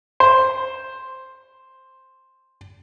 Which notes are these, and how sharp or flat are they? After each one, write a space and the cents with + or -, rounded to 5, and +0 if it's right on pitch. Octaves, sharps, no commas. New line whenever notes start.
C5 +5